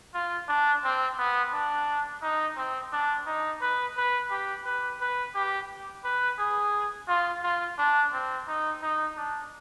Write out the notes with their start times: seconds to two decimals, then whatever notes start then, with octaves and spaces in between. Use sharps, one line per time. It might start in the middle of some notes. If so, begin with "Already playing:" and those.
0.14 F4
0.48 D4
0.84 C4
1.18 B3
1.52 D4
2.22 D#4
2.57 C4
2.92 D4
3.26 D#4
3.61 B4
3.96 B4
4.30 G4
4.65 B4
5.01 B4
5.35 G4
6.04 B4
6.39 G#4
7.08 F4
7.43 F4
7.78 D4
8.13 C4
8.48 D#4
8.82 D#4
9.17 D4